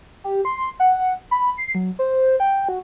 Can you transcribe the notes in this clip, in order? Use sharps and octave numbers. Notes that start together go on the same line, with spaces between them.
G4
C6
F#5
B5
C7
F#3
C5
G5
F#4